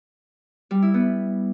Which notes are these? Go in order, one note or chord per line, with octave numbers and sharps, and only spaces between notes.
G3
E4
B3